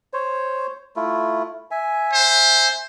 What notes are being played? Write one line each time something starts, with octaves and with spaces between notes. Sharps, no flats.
C5 C#5
A3 E4 F4
E5 G#5
C5